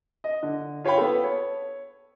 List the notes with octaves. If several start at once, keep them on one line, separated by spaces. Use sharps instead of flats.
D#5
D3
F4 C#5 F5 G5 B5
B3 A4
C#5